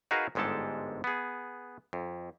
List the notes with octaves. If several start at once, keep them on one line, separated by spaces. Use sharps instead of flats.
D#4 F#4 G#4 A#4 B4 F5
G1 G#2 G#3 G4 A4 A5
B3 G#4
F2